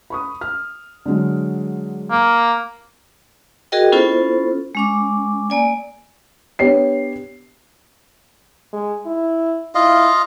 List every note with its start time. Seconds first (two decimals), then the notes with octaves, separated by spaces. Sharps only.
0.10 B5 C#6 D#6
0.41 F6
1.06 D3 F#3 G#3
2.11 A#3
3.72 F#4 G#4 A#4 D#5 G5
3.92 B3 C#4 E4 F4 A4 C5
4.75 G#3 C#4 D6
5.50 A#3 D5 G#5
6.59 B3 D4 G4 C#5 C7
8.73 G#3
9.06 E4
9.75 E4 F4 D#5 F5